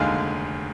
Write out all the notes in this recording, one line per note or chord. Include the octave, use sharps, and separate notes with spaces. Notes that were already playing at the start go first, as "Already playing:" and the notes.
Already playing: F1 D#2 D3 G#3 F5 G#5